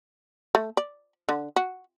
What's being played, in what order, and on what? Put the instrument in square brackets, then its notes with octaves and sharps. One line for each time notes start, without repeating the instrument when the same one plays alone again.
[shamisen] A3
D5
D3
F#4